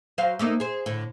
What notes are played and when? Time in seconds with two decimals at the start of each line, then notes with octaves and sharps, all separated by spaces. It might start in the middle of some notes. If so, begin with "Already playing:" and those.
0.18 F#3 C5 F5
0.39 A3 A#3 D#4
0.60 G#4 C5
0.86 A2 D3